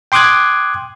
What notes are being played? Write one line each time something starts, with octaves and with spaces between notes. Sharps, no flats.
G5 C6 D6 D#6 F#6 G#6